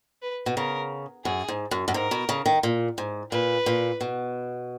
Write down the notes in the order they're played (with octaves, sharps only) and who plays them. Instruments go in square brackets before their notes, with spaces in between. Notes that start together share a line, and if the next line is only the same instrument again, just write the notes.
[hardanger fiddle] B4
[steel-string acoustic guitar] B2
[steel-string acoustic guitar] C#3 [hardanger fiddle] A#4
[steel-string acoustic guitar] F#2 [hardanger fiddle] G#4
[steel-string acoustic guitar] G#2
F#2
F#2
[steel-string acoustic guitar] G#2 [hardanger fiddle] A#4
[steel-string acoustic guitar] B2
C#3
D#3
A#2
G#2
[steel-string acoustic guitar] A#2 [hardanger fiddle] B4
[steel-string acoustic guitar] A#2
B2